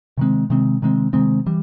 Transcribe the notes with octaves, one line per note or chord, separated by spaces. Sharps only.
C3 D#3 G#3 C4
C3 D#3 G#3 C4
C3 D#3 G#3 C4
C3 D#3 G#3 C4
E3 G3